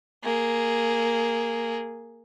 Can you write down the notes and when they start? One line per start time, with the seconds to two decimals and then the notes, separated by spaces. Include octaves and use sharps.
0.23 A#3 G#4